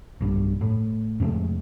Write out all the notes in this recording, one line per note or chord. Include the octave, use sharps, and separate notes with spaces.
B1 G2
A2
F2 C3 G#3 A3